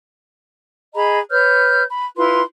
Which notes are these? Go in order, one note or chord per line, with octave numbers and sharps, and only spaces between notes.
G#4 D#5 A#5 B5
B4 C#5 F6 G6
B5
E4 F4 B4 C6